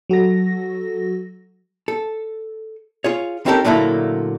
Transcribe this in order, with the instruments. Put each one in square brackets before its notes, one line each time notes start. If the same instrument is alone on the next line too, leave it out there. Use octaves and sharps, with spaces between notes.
[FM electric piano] F#3 F#4 A4 A#6
[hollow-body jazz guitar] A4
F4 G#4 C#5
C4 C#4 D#4 G4 A4 A#4
A#2 D3 F#3 A3 A#3 E4